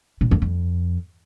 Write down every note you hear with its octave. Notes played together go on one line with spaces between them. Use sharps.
A#2
F2
F2